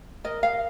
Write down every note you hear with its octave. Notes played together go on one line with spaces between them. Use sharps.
A#4 D#5
F5